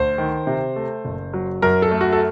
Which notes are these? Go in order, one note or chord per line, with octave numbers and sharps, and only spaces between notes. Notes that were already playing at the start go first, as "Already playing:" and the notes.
Already playing: D2 C5
D#3
C3
A3
F#1
F#3
F#2 A#4
A4
A3
F#4
A4